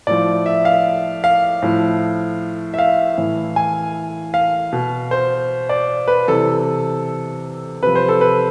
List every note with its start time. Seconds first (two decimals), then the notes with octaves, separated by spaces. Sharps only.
0.07 A2 F3 D5
0.46 E5
0.65 F5
1.24 F5
1.62 A2 F3
2.74 E5
2.79 F5
3.17 A2 E3
3.56 G#5
4.34 F5
4.73 B2
5.11 C5
5.69 D5
6.08 B4
6.28 C3 E3 A4
7.83 C3 F3 B4
7.95 C5
8.08 A4
8.21 B4